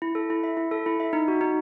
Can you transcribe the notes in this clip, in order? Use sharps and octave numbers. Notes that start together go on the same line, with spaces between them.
E4
A4
E4
E5
E4
A4
E4
E5
D#4
F#4
D#4